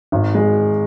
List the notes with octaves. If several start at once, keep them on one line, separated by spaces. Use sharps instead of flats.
G#1
G#3